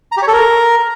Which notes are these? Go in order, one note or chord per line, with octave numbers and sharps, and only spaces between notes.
A#5
G4
C#5
A4
A#4